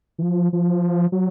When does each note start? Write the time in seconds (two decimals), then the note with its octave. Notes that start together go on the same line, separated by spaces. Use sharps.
0.19 E3
0.22 F3
0.53 F3
1.12 F#3